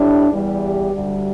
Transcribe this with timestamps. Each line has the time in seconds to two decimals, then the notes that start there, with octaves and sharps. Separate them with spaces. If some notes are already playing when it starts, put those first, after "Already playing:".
Already playing: A2 G3 D4
0.31 E2 E3 G3
0.62 G4
0.93 D2 D3 G3